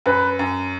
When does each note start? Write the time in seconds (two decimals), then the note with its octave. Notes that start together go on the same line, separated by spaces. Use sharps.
0.06 F#2 B4
0.39 F#2